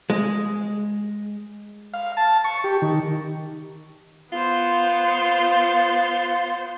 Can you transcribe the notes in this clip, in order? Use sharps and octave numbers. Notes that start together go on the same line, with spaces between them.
G#3
F5
A5
C#6
G4
D#3
B3 F4 C5